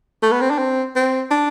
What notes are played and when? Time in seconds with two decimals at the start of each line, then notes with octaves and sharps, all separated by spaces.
0.23 A3
0.32 B3
0.41 C4
0.50 D4
0.58 C4
0.96 C4
1.30 D4